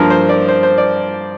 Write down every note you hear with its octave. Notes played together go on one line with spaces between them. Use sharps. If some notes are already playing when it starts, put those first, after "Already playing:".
Already playing: G2 F3 A#3 A#4
C5
D5
C5
C5
D5